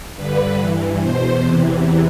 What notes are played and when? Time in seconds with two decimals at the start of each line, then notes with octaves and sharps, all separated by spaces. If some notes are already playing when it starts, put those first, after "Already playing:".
0.16 G2 D3 B4
0.58 G2 E3
1.00 E2 B2 C5
1.44 E2 C3 E3